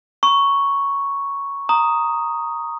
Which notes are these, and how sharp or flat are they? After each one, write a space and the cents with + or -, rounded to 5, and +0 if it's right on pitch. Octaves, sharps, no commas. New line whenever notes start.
A#5 +40 C#6 +0
A#5 -5 D#6 +0